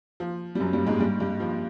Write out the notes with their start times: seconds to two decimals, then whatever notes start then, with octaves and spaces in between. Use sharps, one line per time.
0.20 F3
0.55 G3
0.60 F#2 F#3
0.73 G2 G3
0.87 G#2 G#3
0.99 G2 G3
1.20 G2 G3
1.40 F3